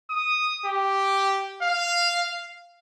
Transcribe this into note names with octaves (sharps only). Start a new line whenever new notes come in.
D#6
G4
F5